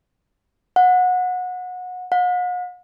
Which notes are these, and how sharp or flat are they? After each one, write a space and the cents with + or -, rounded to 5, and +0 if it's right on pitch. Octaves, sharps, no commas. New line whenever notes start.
F#5 -25
F#5 -45